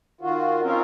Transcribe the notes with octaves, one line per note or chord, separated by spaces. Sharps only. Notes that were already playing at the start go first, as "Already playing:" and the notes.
D#3 F4 F#4
C4 C#4 D#4 F4 A#4